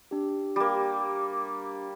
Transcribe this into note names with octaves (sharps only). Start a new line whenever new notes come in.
D4 G4
G3 A#3